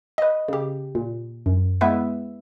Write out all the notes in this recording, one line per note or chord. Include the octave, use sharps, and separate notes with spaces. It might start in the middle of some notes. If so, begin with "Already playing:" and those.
B4 D#5
C#3 G4
A#2
F#2
G#3 B3 E4 B4 E5